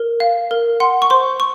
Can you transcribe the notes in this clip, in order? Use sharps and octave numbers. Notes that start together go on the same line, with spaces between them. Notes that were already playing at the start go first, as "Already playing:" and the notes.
Already playing: A#4
F5
A#4
F#5 C6
C#6
C5 C6
C#6